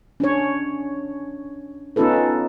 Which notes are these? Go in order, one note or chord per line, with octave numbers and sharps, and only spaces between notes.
C#4 D4 C#5
B3 C#4 D#4 F4 A4 B4